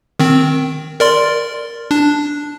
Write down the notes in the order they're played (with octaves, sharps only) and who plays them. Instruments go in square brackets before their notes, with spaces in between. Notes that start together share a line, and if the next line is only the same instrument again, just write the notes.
[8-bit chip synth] D#3 C4
A#4 D5 C6
D4